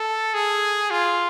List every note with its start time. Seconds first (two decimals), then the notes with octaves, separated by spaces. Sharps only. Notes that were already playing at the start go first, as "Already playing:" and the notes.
Already playing: A4
0.34 G#4
0.91 F4